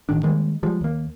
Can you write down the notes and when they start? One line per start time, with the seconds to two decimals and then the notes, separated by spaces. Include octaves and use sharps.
0.09 A1 D#3 D4
0.23 D#3 G3 G#3 A#3
0.63 F3 G3 G#3
0.81 D#2 A#3